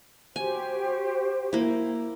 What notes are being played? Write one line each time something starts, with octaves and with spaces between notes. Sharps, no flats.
F#4 G4 C5 G#5
A#3 E4